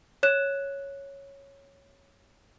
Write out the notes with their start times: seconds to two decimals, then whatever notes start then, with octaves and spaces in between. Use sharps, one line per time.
0.23 C#5 F#6 E7